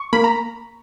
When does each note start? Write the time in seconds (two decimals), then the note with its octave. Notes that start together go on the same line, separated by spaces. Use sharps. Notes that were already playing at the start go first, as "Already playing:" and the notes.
Already playing: C#6
0.13 A#3 B5
0.24 A#5